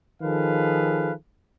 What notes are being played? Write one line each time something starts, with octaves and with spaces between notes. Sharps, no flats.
D#3 F3 G#4 A4 B4 F5